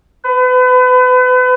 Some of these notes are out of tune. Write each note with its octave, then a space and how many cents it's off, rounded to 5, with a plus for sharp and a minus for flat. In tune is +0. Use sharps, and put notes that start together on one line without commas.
B4 +35